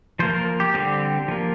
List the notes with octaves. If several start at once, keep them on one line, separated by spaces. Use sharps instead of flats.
F3 A#3 C5
A#4
G4
D3 G3 C4 G4
F3 A#3